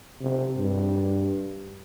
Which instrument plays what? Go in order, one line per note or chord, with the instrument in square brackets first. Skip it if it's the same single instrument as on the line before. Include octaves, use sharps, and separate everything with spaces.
[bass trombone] C3
G2